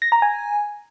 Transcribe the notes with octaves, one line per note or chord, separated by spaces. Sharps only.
A#6
A#5
G#5